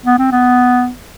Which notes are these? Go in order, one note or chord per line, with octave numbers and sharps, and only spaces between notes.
B3
C4
B3